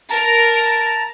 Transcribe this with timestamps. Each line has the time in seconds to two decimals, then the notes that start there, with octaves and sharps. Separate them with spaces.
0.10 A#4 A5 A#5